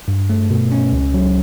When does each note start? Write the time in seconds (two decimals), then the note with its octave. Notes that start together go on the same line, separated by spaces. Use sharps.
0.08 G2
0.30 A3
0.50 B2
0.72 C#4
0.93 C#2
1.14 F#3